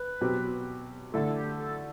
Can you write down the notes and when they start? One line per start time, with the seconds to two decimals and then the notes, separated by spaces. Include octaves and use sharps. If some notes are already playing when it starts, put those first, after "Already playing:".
Already playing: B4
0.21 B2 F#3 C4 G4
1.13 D3 A3 E4 A4
1.36 G4
1.59 A4